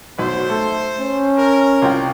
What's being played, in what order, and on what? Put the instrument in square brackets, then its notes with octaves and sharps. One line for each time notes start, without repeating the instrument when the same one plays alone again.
[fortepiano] B1 [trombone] F#4 [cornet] C5
[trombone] A3 [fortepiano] A4
[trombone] C#4
[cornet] A#4
[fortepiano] C2 F4 G5